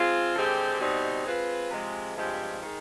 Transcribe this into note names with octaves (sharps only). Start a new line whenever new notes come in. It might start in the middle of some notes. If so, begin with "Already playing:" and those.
Already playing: G#3 C4 F4
D3 G#3 C4 G4
B2 G3 C4 D#4
G#3 C4 F4 B4
C3 F3 G#3
G2 F3 G#3 C4 G4
D#3 G#3